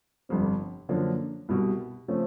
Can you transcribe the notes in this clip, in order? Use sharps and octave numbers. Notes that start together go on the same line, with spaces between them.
G1 F2 C3
F#2 D3 F3 A#3 D4
C2 B2 G3
C#3 F3 A3 C4